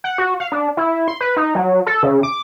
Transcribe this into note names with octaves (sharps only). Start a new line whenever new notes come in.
F#5
F#4
F5
D4
E4
C6
B4
D#4
F#3
A4
C#3
D6